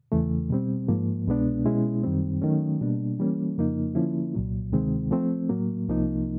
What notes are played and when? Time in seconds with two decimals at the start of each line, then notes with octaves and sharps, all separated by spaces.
0.12 E2 C#3 E3 A3
0.50 B2 G3 C4
0.88 G#2 F3 A#3
1.27 C2 B2 G#3 B3 D4
1.65 B2 G#3 C#4 E4
2.04 F#2 D#3 G3 C4
2.42 D#3 F#3 A3 C#4
2.81 B2 G3 A#3 D4
3.19 E3 G3 A#3 C#4
3.58 F2 C#3 F3 A#3 D#4
3.95 D3 F3 A#3 C#4 E4
4.35 C2 A#2 F#3
4.72 D2 C3 D#3 G#3 C4
5.11 F3 A3 C4
5.49 A2 F#3 A#3
5.88 C2 C3 F3 A#3 D#4